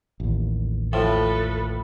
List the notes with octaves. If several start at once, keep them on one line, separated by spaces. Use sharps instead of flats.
A1 D#2
A2 F3 A4 B4